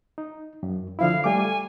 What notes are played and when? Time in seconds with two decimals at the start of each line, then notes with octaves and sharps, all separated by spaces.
0.18 D#4
0.63 F#2
0.99 D3 F3 E4 F5
1.24 G3 A3 G#5 D6